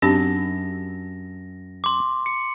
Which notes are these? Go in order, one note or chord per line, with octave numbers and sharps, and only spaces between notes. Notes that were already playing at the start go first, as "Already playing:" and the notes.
F#2 C4 D4 G4 A5 A#6
C6 D6
C#7